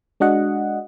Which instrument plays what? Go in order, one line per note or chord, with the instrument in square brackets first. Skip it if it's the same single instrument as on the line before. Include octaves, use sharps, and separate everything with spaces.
[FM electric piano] G#3 D4 F#4 D#5 F#5